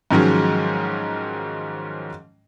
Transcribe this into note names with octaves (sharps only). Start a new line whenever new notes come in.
G#2 D#3 F3 F#3 G#3 C#4